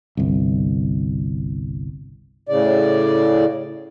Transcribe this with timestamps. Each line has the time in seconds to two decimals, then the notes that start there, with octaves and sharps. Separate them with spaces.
0.17 G1 C2
2.49 A2 C#3 D5